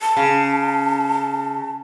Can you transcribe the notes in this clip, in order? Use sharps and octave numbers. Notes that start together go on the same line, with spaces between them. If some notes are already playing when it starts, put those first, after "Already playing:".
A5
C#3